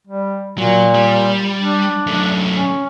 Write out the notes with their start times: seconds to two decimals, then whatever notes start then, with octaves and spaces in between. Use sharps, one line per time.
0.07 G3
0.58 A#2 F#3
0.95 G3
1.60 D4
2.07 F#2 A3
2.55 C#4